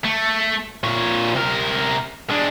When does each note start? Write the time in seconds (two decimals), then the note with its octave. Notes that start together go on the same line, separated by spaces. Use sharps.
0.04 A3
0.84 A#2 C#5
1.35 C3 A#4
2.31 G#3 D4